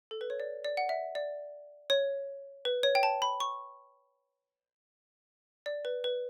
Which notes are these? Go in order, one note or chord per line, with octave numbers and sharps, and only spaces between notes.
A4
B4
C#5
D5
D5
F#5
E5
D5
C#5
B4
C#5
G5
A5
B5
C#6
D5
B4
B4